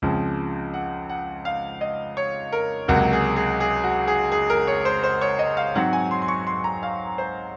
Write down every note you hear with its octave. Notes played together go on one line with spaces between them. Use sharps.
C#2 C#3 F3 C4
F#5
F#5
F5
D#5
C#5
A#4
C#2 C3 F#3 A#3 F#4
G#4
G#4
G#4
F#4
G#4
G#4
A#4
C#5
C5
C5
C#5
D#5
F5
G#2 F#3 C4 F#5
G#5
C6
C6
C#6
C6
A#5
F5
C5